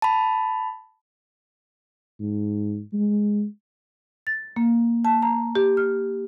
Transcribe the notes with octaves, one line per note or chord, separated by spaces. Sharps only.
A5 B5
G#2
G#3
A6
A#3
A5
A#5
G4
F6